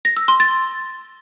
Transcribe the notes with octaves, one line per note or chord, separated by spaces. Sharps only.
A#6
E6
C6
A6